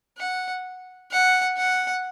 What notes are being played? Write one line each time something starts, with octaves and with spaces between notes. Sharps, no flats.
F#5
F#5
F#5